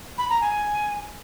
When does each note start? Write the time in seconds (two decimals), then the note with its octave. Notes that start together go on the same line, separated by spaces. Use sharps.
0.18 B5
0.30 A#5
0.41 G#5